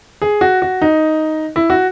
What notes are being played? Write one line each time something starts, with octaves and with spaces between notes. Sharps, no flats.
G#4
F#4
F#4
D#4
E4
F#4